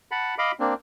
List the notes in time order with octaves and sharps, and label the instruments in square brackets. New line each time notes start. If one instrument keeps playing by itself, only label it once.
[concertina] F#5 A5 B5
D#5 F5 B5 D6
A#3 C4 D4